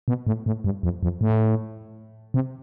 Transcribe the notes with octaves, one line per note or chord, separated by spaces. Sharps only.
B2
A2
A2
G2
F2
F2
A2
C3